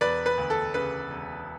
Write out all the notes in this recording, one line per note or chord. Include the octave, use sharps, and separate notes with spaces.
E1 B4 D5
B4
D2
A4
C#3 B4
E1